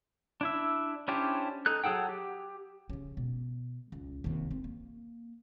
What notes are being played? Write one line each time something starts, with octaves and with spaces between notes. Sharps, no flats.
D4 E4 E5
C#4 D4 E4 G4 C5
D#4 A4 F#6
F#3 G#4 A4 F#5 G5
G4
C#3 C#4
B2
C#2
D#2 C3
C4
A#3